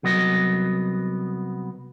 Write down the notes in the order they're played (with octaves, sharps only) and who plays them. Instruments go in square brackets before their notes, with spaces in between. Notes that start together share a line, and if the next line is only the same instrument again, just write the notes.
[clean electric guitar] C2 F#3 B3 D#5